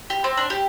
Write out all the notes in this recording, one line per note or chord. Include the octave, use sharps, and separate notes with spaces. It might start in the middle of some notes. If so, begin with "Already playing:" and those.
G4
C4
D4
G4